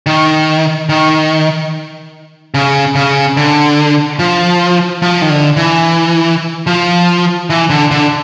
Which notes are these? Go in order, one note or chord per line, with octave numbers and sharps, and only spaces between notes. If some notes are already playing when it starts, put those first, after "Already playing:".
D#3
D#3
C#3
C#3
D3
F3
F3
D#3
D3
E3
F3
E3
D3
D3